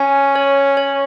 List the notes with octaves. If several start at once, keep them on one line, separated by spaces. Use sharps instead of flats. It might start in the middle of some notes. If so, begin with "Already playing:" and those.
Already playing: C#4 G#5
C#5
C#5